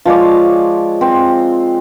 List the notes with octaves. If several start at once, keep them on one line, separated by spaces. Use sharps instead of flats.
F3 G#3 C#5 D5
C4